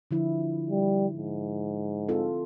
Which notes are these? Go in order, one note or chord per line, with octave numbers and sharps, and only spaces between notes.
D3 F3 E4
G3
G#2
C4 F4 A4